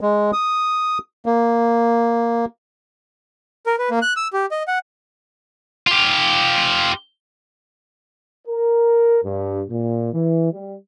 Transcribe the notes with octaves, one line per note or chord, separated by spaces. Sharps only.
G#3
D#6
A#3
A#4
B4
A#3
F#6
E6
G4
D#5
F#5
F4 G4
A#4
G2
A#2
E3
G3